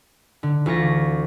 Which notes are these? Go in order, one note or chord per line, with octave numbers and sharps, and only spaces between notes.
D3
D2 E3 F4 C#6 A#6